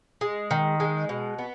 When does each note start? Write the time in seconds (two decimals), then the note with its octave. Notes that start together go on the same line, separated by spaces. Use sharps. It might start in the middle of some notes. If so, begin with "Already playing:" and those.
0.21 G#3
0.51 D#3
0.80 G#3
1.09 B2
1.39 B3